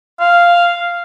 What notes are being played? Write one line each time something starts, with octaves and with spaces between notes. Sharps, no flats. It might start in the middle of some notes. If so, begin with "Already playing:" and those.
F5